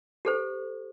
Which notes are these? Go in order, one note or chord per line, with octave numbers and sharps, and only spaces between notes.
G4 A4 C5